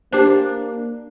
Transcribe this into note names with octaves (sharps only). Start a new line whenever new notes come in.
A#3 D4 G4 C5